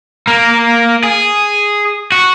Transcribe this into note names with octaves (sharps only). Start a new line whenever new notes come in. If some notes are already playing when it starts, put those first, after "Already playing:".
A#3
G#4
F#4